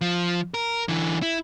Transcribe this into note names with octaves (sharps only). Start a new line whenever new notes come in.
F3
A#4
D3 E3
E4